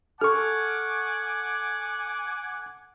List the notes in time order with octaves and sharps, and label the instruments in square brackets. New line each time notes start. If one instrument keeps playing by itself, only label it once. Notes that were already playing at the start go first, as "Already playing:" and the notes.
[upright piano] A4 [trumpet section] F#5 G#5 D6 [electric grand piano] C#6 F6